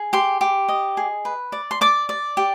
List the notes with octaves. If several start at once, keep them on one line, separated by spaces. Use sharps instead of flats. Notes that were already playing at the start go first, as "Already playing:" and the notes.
Already playing: G#4
G4 C6
G4
D#5
G#4
B4
D5
C6
D5 D6
D5
G4